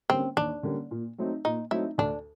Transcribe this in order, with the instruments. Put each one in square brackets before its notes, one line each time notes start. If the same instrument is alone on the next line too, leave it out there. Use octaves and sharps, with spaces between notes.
[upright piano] D3 G3 A#3 C#4 [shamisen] C4
[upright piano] D#2 [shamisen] D4
[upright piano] D3 G3 A#3 C#4
A#2
F#3 A3 C4 D#4
[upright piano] A#2 [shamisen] D#4
[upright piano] F#3 A3 C4 D#4 [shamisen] E4
[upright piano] D2 [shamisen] D4